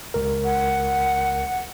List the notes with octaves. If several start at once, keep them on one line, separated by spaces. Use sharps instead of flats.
C#2 A#4
F#5